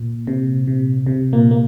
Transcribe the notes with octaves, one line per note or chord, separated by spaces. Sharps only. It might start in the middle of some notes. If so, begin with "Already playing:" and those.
Already playing: A#2
C3
C3
C3
A#2 A#3
A#3